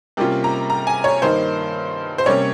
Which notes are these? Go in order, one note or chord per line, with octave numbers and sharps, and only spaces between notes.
C3 G3 A#3 C#4 F4
A#5
A#5
G#5
C#5
G2 D#3 A#3 D#4 C5
C5
C3 G3 A#3 C#4 C#5